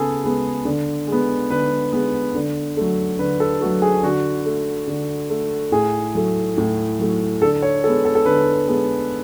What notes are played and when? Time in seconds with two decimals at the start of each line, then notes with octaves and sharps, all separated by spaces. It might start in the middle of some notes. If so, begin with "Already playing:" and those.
Already playing: C#3 B3 G#4 A4
0.24 G#3 B3
0.65 D3
1.07 G#3 B3
1.50 D3 B4
1.92 G#3 B3
2.35 D3
2.77 F#3 A3
3.19 D3 B4
3.40 A4
3.61 A3 F#4
3.66 F#3
3.82 G#4
4.03 D3 F#4
4.46 A3
4.87 D3
5.30 A3
5.72 A2 G#4
6.15 F#3 A3
6.58 A2
6.99 F#3 A3
7.42 D3 A4
7.62 C#5
7.84 G#3 B3 A4
8.05 A4
8.15 A4
8.25 D3 B4
8.68 G#3 B3